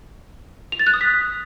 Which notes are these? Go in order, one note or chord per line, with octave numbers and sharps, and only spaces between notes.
F7
A6
F#6
D#6
B6